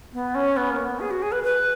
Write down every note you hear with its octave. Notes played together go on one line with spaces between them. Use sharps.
B3
C#4
B3
A#3
B3
G#4
F#4
G#4
B4
B4